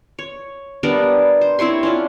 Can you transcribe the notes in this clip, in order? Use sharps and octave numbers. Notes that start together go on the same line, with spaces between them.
C#5
G3 B3 D4 A#4
C5
C4 E4 C#5 C6
C#4 D4 F4